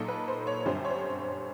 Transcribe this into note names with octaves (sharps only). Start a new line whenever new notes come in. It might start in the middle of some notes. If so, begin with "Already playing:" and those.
Already playing: A#2 F#3 A#3 D#4 A4
B4
C5
C#5
G1 F#2 D3 G3 C4 C5
C#5
C5